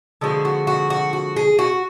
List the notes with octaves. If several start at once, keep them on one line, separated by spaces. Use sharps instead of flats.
D3 F3 G#3 B3 F#4
F#4
F#4
F#4
F#4
G#4
F#4